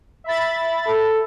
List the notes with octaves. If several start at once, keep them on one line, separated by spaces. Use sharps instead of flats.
E5 B5 A6
A4